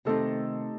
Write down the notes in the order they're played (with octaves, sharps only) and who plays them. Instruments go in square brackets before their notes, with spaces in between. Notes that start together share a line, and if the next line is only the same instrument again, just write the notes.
[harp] C3 D#3 A3 C4 D#4 [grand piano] A4